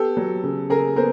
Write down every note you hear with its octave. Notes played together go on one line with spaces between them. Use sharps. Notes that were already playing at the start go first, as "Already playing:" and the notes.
Already playing: B3 G4 A4
F#3
C#3
C#3 G#4 A#4
B3 A#4 C5